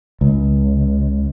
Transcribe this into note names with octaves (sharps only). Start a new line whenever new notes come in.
C#2